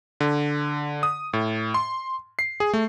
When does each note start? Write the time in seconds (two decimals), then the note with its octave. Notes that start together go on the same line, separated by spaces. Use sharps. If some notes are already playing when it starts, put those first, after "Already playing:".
0.21 D3
1.03 D#6
1.33 A2
1.74 C6
2.39 C7
2.60 G#4
2.74 A3